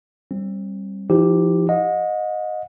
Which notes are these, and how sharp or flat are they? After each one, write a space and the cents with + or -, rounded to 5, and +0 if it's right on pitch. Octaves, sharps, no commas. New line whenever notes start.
G3 +0 C4 +30
F3 -30 D#4 +45 G4 +0
D#5 +0 F#5 -40